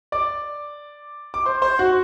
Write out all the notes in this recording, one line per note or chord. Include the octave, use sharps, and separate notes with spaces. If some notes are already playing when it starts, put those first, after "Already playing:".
D5 D6
D6
C5 C6
C5 C6
F#4 F#5